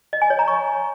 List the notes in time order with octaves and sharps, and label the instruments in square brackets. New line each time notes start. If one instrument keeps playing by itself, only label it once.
[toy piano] D#5
G#5
C#5
A#5
C#6